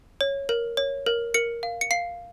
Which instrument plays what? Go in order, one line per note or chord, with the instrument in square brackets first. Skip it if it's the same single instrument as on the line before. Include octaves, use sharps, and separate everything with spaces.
[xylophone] C#5
A#4
C#5
A#4
A#4 C#7
F5
C#7
F5 C7